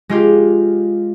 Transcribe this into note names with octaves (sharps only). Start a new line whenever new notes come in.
G#3 F4 G4